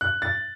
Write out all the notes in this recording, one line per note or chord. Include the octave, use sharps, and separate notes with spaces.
F#6
A6